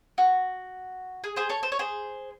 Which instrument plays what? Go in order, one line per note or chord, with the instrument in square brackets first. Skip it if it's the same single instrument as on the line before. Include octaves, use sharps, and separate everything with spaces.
[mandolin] F#4
G#4
G#4 C5
A4 C#5
C5
C#5
G#4 C5